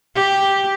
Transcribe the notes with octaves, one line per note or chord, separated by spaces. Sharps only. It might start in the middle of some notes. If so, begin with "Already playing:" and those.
G4